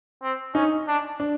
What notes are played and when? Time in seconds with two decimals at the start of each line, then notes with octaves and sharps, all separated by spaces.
0.23 C4
0.54 C#4 D#4
0.87 D4
1.20 D4